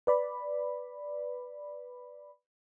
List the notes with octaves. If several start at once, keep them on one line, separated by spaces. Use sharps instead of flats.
B4 D5 B5